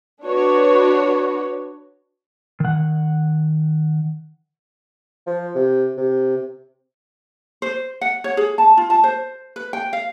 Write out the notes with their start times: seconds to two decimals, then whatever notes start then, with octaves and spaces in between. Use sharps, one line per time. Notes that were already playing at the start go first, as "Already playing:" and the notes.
0.25 D4 F#4 B4 C#5
2.60 D#3 F#5
5.27 F3
5.55 C3
5.97 C3
7.62 C5
8.01 F#5
8.24 C#5
8.37 G#4
8.58 A5
8.77 F4
8.90 A5
9.04 C5
9.56 B4
9.73 G5
9.93 F5